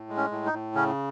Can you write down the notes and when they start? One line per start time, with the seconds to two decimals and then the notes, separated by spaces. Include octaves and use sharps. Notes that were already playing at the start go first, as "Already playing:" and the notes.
Already playing: A2
0.09 G#3
0.17 C#4
0.31 A2
0.46 D#4
0.53 A2
0.75 C#3 C#4